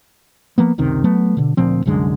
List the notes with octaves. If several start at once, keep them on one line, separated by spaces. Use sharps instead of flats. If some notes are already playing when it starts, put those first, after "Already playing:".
F3 A#3 B3
F#1 C#2 C3 D#3
F#3 A3 B3
B2 D3
D2 A#2 F3 C4
C2 F#2 D3 G#3